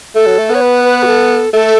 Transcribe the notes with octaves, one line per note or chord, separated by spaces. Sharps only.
A3 A4
F#3
A3
B3 C#5
B4
B4
F#4
A4
A3 A4